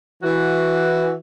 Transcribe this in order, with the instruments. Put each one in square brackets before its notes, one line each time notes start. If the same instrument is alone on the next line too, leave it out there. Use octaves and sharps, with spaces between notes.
[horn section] E3 F#4